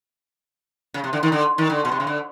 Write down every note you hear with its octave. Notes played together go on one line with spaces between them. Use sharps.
C#3
C3
D3
D#3
D3
D#3
D3
B2
C3
C#3
D3